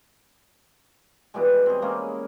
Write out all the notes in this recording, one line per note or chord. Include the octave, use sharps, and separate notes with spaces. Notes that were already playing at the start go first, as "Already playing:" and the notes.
B2 E3 G3 G#3
C4 G#4
G#3 A#3 C#4